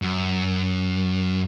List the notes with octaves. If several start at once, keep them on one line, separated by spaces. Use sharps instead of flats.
F#2